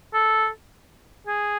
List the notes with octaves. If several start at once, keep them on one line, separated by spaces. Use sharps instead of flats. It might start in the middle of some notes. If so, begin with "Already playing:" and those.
A4
G#4